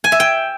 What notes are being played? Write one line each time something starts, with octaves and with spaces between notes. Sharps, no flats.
G#5
E5
G5